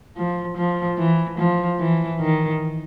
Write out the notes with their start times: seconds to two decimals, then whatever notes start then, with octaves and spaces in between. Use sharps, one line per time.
0.17 F3
0.57 F3
0.98 E3
1.38 F3
1.79 E3
2.20 D#3